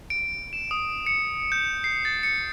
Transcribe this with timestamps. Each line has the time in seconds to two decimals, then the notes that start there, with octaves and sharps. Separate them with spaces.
0.10 D7
0.53 E7
0.71 D#6
1.06 C#7
1.52 G6
1.84 C7
2.05 A6
2.23 C#7